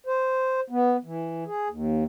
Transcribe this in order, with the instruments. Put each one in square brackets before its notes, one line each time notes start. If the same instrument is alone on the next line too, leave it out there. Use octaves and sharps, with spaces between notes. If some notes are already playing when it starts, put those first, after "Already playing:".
[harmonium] C5
B3
E3
G#4
D#2